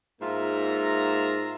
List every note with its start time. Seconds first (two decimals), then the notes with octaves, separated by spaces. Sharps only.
0.21 G#2 A#3 F4 E5 A#5